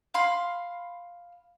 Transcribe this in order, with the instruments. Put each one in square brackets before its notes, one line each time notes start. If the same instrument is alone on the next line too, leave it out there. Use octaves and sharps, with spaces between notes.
[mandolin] F5 B5 C6